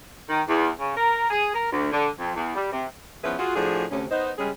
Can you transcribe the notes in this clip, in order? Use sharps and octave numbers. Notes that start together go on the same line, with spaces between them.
D#3
E2
C#3
A#4
G#4
A#4
D2
D3
F2
E2
G3
C3
F3 B3 C#4 E4 G#4 B4
F4 F#4 G#4
A2 F3 D4 F#4 G#4
D2 C3 C#4
B3 D#4 C5
C#3 G3 G#3 C#4 G#4